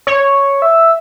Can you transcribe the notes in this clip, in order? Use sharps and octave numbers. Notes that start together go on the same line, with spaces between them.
C#5
E5